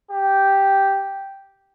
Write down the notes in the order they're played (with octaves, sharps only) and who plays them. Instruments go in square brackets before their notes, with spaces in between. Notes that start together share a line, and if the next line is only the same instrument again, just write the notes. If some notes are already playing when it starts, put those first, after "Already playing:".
[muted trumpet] G4